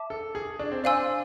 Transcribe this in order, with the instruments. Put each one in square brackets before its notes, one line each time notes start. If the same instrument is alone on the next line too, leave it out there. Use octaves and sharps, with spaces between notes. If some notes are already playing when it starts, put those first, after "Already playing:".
Already playing: [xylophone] E5 A5 D6
[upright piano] A4
G#4
D4
C4
[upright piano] D4 [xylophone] C5 F5 G#5 C6 E6